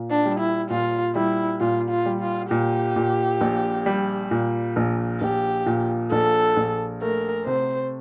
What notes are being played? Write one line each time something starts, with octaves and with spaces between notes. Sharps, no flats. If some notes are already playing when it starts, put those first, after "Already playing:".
Already playing: A#2
D4
G3
E4
A#2 F4
G3 E4
A#2 F4
F4
G3
F4
A#2 G4
A#2
A#1
G3
A#2
A#1
A#1 G4
A#2
A#1 A4
A#1
A3 A#4
C3 C5